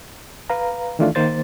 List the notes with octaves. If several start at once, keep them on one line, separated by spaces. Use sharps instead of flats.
B4 F5 A#5
D#3 E3 A3 D4 F4
D#3 A#3 C5 A6